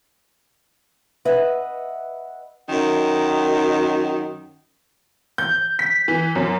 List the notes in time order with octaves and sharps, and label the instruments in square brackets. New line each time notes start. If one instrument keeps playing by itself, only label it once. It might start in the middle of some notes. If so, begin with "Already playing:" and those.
[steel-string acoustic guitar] B4 D#5 E5 F#5
[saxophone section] F#2 D#3
[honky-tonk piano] G6
B6
E3
F#2